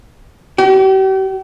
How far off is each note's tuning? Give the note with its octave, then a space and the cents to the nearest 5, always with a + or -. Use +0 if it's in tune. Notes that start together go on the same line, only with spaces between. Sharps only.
G4 -40